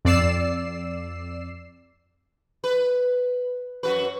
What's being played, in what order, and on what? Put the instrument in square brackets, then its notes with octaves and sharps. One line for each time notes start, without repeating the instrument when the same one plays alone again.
[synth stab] F2 D5 E6 C7 E7
[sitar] B4
F#2 F#4 B4